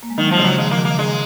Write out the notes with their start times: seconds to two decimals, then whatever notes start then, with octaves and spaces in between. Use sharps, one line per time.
0.03 A#3
0.10 G#3
0.18 D#3 F#3
0.28 F3 F#3
0.38 C#3 G#3
0.44 D#3 F#3
0.58 F3 G#3
0.71 A#3
0.78 D#3
0.85 A#3
0.99 G#3